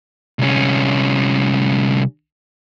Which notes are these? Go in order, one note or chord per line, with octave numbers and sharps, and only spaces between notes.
C2 C#4